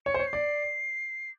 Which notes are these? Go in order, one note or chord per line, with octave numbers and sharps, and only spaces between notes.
C#5 C#7
C5
C#5
C7
D5